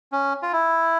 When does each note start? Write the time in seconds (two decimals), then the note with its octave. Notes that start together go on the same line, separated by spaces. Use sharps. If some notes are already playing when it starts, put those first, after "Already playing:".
0.12 C#4
0.42 F4
0.53 E4